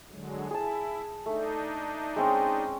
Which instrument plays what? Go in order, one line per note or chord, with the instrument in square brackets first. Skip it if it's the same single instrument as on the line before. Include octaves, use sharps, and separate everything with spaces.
[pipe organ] D3 F#3 G#3
[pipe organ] E4 [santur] G#4 A5
[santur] A3 [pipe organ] D4 D#4
[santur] G#3 C4 C#4